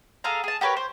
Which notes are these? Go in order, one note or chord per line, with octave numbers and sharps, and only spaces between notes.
G#4 A4 F5 A#5
G#4 A5
G4 A#4 B4 C#5
C5